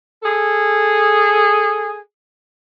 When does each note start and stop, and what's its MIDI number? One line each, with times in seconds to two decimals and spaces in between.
0.23 1.97 68
0.23 1.97 69